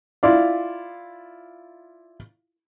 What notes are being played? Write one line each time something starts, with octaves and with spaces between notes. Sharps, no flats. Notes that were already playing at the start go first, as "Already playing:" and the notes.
E4 F4 D5 F5